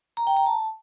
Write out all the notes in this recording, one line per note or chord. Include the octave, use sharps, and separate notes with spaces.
A#5
G5
A#5
A5